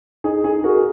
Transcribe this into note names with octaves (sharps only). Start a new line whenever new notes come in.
D#4 G#4
D#4 G#4
F#4 A#4